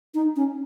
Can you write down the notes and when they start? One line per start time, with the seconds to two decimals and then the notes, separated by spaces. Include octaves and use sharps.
0.14 D#4
0.36 C#4